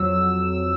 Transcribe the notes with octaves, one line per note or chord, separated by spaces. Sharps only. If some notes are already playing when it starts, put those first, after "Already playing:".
Already playing: F2 F#3 E6